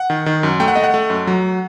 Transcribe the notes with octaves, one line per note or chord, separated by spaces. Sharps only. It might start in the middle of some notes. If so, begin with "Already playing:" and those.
Already playing: F#5
D#3
D#3
F#2
A3 G5
F#5
A3 D#5
F#5
A3
F#2
F#3